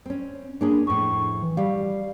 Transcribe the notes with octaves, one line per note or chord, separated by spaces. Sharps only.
C4 C#4
A#3 C#4 D4 G#4
F2 A2 C#6
E3
G3 F5